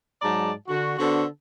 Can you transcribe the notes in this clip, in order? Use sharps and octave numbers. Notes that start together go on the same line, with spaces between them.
G#2 F#3 G#3 D5 A5 A#5
D3 F#4
D3 B3 D4 F#4 A4 C5